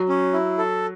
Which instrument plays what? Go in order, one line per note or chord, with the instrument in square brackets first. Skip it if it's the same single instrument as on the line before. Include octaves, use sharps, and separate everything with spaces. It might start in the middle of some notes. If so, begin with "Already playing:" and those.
Already playing: [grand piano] F#3
[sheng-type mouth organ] C#4
E4
A4